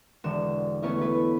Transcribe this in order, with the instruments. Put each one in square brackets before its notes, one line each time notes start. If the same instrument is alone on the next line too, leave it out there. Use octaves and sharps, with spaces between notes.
[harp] E1 D3 E7
A3 B3 C#4 E4
E4 A4 B4